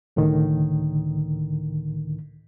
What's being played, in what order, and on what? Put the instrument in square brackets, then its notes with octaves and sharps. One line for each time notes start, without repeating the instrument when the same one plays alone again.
[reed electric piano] C#2 A2 D3 D#3